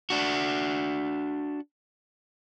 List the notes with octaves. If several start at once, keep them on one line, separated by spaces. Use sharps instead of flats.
D4 F#4